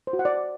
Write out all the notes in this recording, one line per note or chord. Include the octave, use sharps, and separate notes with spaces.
C5
F#4
F#5
D5